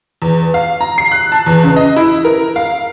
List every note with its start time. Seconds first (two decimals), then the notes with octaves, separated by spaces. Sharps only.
0.22 E2
0.54 F5
0.81 A#5
0.98 C7
1.12 F#6
1.32 A5
1.46 E2
1.63 C#3
1.76 D#5
1.96 E4
2.25 A#4
2.56 F5